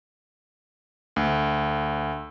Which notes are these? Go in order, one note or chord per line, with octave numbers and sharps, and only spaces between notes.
D2